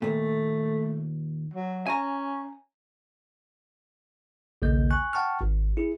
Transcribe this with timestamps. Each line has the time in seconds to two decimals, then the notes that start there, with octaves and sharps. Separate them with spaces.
0.02 D#2 A#2 A3
1.54 F#3
1.87 C#4 G#5 A#5
4.62 A#1 D#2 C#3 A#3 D#5 G6
4.91 G#5 C#6 F#6
5.13 F#5 G5 A5 C#6 F6
5.41 G#1
5.77 E4 G#4